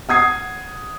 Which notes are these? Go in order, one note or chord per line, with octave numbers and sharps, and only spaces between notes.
F#5 D#6 G#6 C7